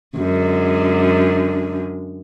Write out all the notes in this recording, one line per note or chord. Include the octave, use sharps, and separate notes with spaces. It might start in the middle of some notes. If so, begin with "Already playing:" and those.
F#2 D3 G#3